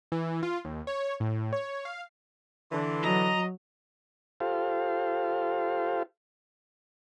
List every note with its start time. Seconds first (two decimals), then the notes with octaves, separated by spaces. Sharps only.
0.12 E3
0.43 F4
0.65 D#2
0.87 C#5
1.20 A2
1.53 C#5
1.85 F5
2.72 D3 E3 D4 C6
3.04 F#3 D#5 A#5
4.40 F4 G4 A4 C5 F5